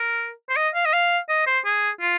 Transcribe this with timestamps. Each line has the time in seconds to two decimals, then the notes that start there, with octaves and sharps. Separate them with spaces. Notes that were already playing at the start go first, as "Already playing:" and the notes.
Already playing: A#4
0.50 C5
0.56 D#5
0.75 F5
0.85 D#5
0.93 F5
1.29 D#5
1.47 C5
1.65 G#4
2.01 F4